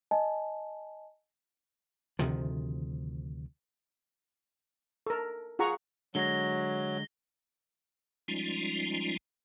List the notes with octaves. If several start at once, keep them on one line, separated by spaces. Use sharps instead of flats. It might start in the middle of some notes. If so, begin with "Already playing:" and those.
D#5 G#5 A5
D2 C3 D#3 F3
A4 A#4
F4 G#4 F#5 A#5 C#6
D3 F#3 G#3 A#6 G7
F3 G3 G#3 C#4 D#4 F4